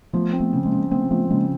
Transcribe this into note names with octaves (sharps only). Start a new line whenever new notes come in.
F3 A3 B3
C4
A3 B3
C#3
G#3 A#3
C#3
A3 B3 C4
F3 A3 B3
C#3 G#3 A#3